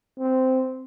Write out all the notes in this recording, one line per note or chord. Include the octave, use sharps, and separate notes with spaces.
C4